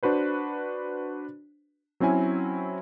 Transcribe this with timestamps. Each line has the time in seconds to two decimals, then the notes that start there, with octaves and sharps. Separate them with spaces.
0.03 D4 F#4 B4 C5
2.00 F#3 C4 C#4 E4 G#5